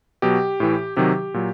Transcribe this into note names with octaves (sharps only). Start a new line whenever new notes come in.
B2 F#3 G4
A2 E3
C3 D#3 F#3 G4
A#2 F#3